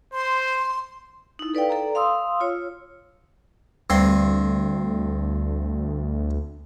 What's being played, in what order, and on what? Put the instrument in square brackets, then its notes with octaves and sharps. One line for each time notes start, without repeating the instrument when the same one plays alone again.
[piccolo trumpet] C5 [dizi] C6
[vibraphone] D#4 E4
A4 B4 D5 F5 G5
A4 D5 A#5
F5 C6 D#6 E6
F4 C#5 E6
[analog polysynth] D2 [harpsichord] G2 C4 C6